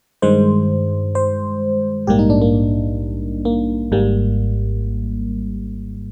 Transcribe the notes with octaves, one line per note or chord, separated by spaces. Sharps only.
G2 D#3 G#3 C5
C5
A#1 G#2 G3 A#3 G4
D#4
D4
A#3
A#3
G#1 G#2 G3 A#3